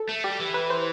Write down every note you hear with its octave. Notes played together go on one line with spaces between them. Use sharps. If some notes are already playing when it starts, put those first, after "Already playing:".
Already playing: A4
A3
G3 G4
E3
B4
C5